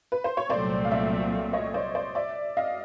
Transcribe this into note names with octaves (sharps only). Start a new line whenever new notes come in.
B4
C5
C#5
C2 A#2 F#3 A3 C4 C5 D5
F5
D5 E5
C#5 D#5
C5 D5
C5 D5
D5 E5
D#5 F5